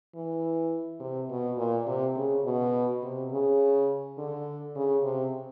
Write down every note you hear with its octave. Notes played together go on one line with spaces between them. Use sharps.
E3
C3
B2
A#2
C3
C#3
B2
C3
C#3
D3
C#3
C3